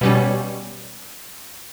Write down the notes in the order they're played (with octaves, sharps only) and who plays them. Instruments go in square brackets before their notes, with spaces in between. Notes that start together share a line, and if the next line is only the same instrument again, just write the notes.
[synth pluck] B2 G3 C#4